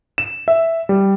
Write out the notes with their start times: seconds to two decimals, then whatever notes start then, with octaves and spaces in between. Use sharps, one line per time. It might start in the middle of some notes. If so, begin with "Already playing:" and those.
0.18 E7
0.48 E5
0.89 G3